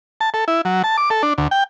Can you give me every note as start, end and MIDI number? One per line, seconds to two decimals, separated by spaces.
0.21 0.30 81
0.34 0.45 69
0.48 0.61 64
0.65 0.82 54
0.84 0.97 81
0.97 1.10 86
1.10 1.23 69
1.23 1.33 62
1.38 1.48 38
1.51 1.64 79